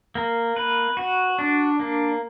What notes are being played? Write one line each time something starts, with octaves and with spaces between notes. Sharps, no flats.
A#3
B4
F#4
D4
A#3